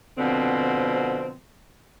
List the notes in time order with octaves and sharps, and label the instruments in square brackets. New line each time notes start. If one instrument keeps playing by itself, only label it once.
[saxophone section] B2 D3 F3 C4